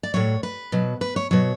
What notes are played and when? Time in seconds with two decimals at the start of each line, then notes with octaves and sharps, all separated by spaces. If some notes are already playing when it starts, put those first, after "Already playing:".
0.03 D5
0.14 A2 F#3 C#5
0.43 B4
0.72 B2 F#3
1.01 B4
1.16 C#5
1.31 B2 F#3 C#5